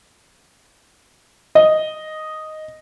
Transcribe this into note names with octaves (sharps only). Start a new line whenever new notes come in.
D#5